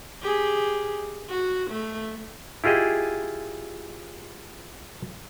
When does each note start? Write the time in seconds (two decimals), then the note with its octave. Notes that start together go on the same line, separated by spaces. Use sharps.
0.23 G4 G#4
1.30 F#4
1.70 A3
2.64 E4 F4 G4 G#4 D#5